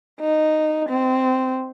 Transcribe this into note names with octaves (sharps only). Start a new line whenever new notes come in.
D#4
C4